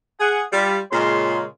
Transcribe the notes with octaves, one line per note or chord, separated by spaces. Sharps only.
G#4 F#5
G3 F4
A#2 C#3 G#3 A#4 C#5 C6